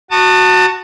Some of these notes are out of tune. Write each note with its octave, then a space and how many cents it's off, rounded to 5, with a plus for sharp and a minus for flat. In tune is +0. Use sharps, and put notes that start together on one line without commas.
F#4 +0 A5 +25 D#6 -30